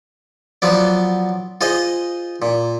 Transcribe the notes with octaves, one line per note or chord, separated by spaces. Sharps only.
F3 F#3 B3 D5
F4 G#4 C5 D#5
A#2